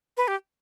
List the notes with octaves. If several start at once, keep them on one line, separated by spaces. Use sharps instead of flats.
B4
G4